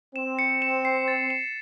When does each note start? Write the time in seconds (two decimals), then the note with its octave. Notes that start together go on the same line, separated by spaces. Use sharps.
0.15 C4 E7
0.39 C#7
0.62 E7
0.85 C7
1.08 A6
1.30 E7